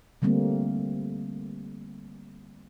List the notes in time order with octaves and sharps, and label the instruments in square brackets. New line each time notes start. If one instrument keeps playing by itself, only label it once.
[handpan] D3 G3 A3 A#3 C4